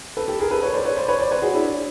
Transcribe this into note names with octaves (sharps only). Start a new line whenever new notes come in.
A4 B4
G4 A4
G#4 A#4
A4 B4
B4 C#5
C5 D5
B4 C#5
C5 D5
B4 C#5
C5 D5
B4 C#5
F#4 G#4
D4 E4